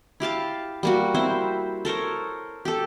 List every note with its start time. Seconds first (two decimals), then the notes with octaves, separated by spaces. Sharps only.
0.20 E4 G4 F5 A5
0.83 G3 A#3 F#4
1.14 C4 E4 C5 E5
1.85 A4 A#4 C5 C#5
2.65 G4 A4